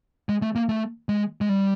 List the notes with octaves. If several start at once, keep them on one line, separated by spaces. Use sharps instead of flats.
G#3
A3
A#3
A3
G#3
G#3
G3